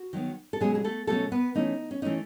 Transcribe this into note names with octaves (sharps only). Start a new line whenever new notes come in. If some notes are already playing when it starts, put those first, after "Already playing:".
Already playing: F#4
D#3 F#3 B3
A4
B2 F#3 G#3 C#4 G#4
G#4
A3 A4
B2 F#3 A3 C#4 A4
B3 B4
E3 A3 C#4 D#4
C#4
E3 A3 C#4 D#4